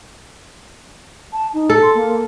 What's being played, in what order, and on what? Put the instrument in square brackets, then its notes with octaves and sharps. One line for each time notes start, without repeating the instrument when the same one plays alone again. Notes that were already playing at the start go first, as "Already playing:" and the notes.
[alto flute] A5
D#4
[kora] A4
[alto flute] C6
A#3